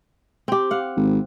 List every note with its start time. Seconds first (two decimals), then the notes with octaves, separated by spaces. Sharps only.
0.48 C4 G4
0.71 F5 F#5
0.96 G#1